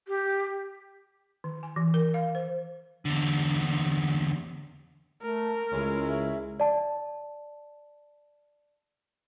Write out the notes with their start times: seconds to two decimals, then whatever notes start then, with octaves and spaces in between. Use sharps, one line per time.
0.08 G4
1.44 D#3
1.63 G#5
1.76 E3
1.94 A#4
2.14 F5
2.35 C5
3.05 E2 D3
5.22 A3 A#4
5.73 C#2 G#3 C#4 E4 A4
6.08 E5
6.60 D5 A5